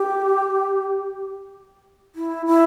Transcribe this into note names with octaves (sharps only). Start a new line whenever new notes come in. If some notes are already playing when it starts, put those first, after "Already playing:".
Already playing: G4
E4
E4